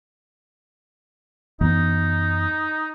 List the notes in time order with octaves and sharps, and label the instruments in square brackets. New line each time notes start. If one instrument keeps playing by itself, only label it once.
[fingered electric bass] F#2 E3 B3 [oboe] D#4